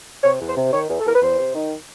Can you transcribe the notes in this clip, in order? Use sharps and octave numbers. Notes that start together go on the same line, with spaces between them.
C3 C#5
E2
C5
C3
D#3 C#5
E2
A4
E2 A#4
B4
E2 C5
C3
D#3